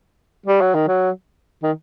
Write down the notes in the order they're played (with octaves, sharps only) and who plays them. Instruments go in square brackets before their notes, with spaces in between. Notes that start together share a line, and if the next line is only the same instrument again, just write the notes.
[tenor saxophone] G3
F#3
D#3
F#3
D#3